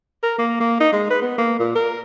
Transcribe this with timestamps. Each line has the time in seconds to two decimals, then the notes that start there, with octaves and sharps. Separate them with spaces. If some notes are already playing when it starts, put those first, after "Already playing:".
0.23 A#4
0.39 A#3
0.60 A#3
0.80 D#4
0.93 G#3
1.10 B4
1.22 B3
1.38 A#3
1.59 A#2
1.75 A#4